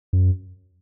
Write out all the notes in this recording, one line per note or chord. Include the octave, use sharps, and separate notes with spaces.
F#2